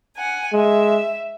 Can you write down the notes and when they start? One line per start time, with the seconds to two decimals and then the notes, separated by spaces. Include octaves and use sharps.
0.16 F#5 G#5
0.53 G#3 E5